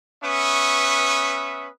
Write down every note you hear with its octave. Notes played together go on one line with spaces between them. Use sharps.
B3 C#4 B4 E5 C#6 D#6